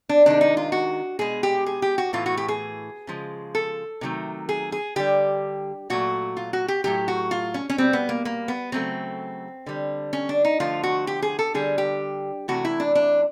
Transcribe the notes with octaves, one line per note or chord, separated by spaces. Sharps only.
D4
C3 D#3 G#3 D4
D#4
F4
F#4
B2 G#3 G#4
G4
G#4
G4
F#4
A2 E3 A3 F4
F#4
G4
G#4
C#3 F3 G#3
A4
C3 D#3 F#3 A3
G#4
G#4
D3 G3 G4
A#2 F#3 A3 F#4
F4
F#4
G4
A2 F#3 A3 G4
F#4
F4
C#4
C#4
B2 G3 C4
B3
A#3
A#3
B3
C#3 F#3 A3 C4
D3 G3
C#4
D4
D#4
D3 F3 A3 F4
F#4
G4
G#4
A4
D3 G3 G#4
G4
C3 E3 A3 F#4
E4
D4
D4